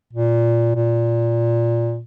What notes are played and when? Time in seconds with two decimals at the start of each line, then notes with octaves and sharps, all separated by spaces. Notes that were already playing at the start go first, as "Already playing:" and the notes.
0.13 A#2
0.75 A#2